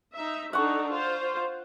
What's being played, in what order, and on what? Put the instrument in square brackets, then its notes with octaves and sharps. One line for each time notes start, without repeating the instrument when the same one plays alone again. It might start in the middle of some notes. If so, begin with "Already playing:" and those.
[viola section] D#4 E5
[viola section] D4 D#4 A4 [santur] F#5 C#6
[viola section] F4 C5